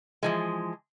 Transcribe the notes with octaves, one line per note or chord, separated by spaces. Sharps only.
E3 F3 G#3